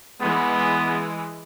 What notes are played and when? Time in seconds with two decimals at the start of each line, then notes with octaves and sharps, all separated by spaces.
0.21 E3 G#3 B3